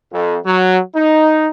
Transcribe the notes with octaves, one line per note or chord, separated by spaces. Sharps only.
F2
F#3
D#4